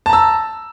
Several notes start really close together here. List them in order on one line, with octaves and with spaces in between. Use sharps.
A5 A#5 E6